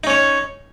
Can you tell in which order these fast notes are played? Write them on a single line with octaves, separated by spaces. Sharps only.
D#4 C#4 C#5